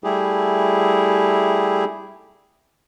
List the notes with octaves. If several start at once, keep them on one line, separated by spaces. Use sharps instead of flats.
G3 A3 E4 G4 G#4